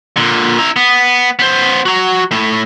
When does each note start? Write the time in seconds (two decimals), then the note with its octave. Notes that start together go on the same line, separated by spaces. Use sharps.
0.17 A#2 D3
0.59 E4 A#5
0.76 B3
1.39 B3 C5
1.86 F#4 A#5
2.31 A3 E4